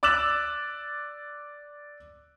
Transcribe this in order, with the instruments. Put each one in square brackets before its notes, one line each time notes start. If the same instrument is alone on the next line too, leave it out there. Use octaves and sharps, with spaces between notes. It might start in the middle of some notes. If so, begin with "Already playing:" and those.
[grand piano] D5 D6 E6 F#6 E7 F#7